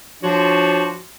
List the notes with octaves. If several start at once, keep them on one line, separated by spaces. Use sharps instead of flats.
F3 D4 F4 F#4 C#5